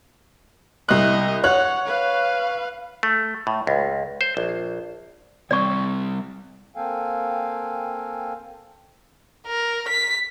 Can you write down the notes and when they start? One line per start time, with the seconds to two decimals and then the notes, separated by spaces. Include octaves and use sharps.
0.89 C2 D#5 E5 F#6
1.44 C#5 F#5 F#6
1.86 B4 F5
3.03 A3
3.47 A2
3.67 C#2
4.21 C5
4.37 A#1
5.51 C3 G3 C4 D5 C#6
6.75 A#3 C4 A4 F5 G5 G#5
9.47 A#4
9.88 B6